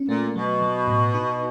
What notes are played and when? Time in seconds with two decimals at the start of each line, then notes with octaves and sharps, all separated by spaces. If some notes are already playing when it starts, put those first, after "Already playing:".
Already playing: C#4
0.09 A#2 A3
0.35 B2 F#3
0.62 F#3
0.88 A2
1.15 D#4